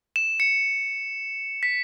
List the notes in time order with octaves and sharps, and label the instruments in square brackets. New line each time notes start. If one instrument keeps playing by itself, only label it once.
[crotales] E7
C#7
B6